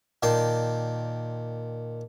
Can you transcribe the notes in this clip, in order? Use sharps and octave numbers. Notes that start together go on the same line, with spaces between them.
A#2 D#3 D5 G5 A5 C6